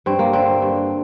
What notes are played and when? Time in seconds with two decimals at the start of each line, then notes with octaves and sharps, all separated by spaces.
0.06 G2 C4
0.19 A#3
0.33 D3 C4
0.62 G2